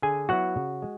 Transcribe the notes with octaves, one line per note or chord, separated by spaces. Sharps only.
D3 G#4 G#5
F#3 B3 E4 F#4 F#5
C#3
G#3